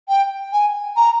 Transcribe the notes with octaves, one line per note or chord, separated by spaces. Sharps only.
G5
G#5
A#5